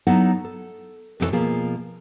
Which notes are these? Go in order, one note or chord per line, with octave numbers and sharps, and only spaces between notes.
F#3 B3 D#4 E4 A4 F#5
A4
F2 C3 E3 D4 A4 C#5
B2 F3 A#3 G#4